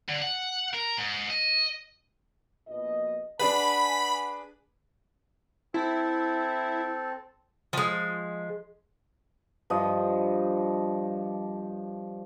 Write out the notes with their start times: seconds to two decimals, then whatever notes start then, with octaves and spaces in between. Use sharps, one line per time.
0.09 D3
0.22 F#5
0.73 A#4
0.97 G#2
1.30 D#5
2.67 A#1 B2 D#5
3.39 D4 G#4 B4 F#5 G#5 A5 B5
5.74 C4 E4 A4
7.73 F3 G#3
9.70 G2 F3 D#5